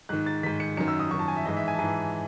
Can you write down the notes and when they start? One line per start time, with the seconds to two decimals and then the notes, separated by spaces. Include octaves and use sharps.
0.09 G#2 D#3 F#6
0.26 A6
0.43 G#2 D#3 B6
0.60 C#7
0.77 F#2 D#3 C#7
0.88 E6
1.00 D#6
1.11 F#2 D#3 C#6
1.19 A5
1.28 G#5
1.36 E5
1.45 G#2 E3 D#5
1.57 E5
1.68 G#5
1.75 A5
1.79 G#2 E3 G#5